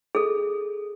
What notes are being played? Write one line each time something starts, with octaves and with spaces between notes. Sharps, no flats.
G#4 A4